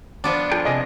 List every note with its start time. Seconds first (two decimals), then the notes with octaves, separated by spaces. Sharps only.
0.24 F3 B3 D4
0.51 F4 G#4 A4 G5
0.65 C3 G#4 D5 D#5 G#5 A#6